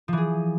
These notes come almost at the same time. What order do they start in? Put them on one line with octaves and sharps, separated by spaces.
F3 E3 G#4